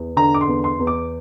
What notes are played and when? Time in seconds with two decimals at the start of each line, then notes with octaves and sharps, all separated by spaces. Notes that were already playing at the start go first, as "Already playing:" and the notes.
Already playing: E2 E3
0.17 D3 A#5
0.34 D6
0.41 C6
0.48 E2
0.64 C6
0.79 E2
0.87 D6